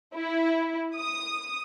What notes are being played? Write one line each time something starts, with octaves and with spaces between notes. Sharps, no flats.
E4
D#6